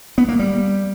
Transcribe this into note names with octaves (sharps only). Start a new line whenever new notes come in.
B3
A#3
G3